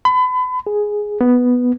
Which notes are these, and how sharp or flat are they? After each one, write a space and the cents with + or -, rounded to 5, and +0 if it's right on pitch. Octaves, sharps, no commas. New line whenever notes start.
B5 +35
G#4 +0
B3 +0